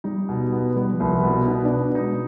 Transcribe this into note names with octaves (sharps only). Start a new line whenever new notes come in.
G3 D#4
B2
B3
G3 B3
F3
C2
G3
B2
B3
B3 D#4
D4
B2
D4
D#4
G#3